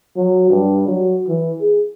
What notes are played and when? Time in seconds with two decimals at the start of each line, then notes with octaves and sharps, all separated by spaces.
0.17 F#3
0.50 G2
0.88 F#3
1.28 E3
1.61 G#4